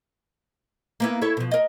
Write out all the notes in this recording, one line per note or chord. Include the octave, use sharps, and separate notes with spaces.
A#3 B3 E4
E4 A4 C#5
B2 F3
A#4 D#5